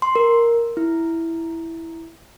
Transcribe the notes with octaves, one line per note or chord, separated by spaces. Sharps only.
C6
A#4
E4